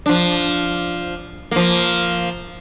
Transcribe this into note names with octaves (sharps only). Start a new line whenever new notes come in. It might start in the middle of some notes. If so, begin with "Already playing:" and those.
F3 D4
F3 A#3